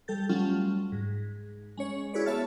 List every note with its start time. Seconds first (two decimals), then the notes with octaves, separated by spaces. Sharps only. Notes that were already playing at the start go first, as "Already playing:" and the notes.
0.08 G3 A4 G6 A6
0.29 F#3 G3 A3 C#4 F4
0.92 G#2
1.77 G#3 C#4 C#5
2.13 E4 F#4 G#4 B4 C#5 D5
2.26 B3 C#5 E5 A5 F6 A6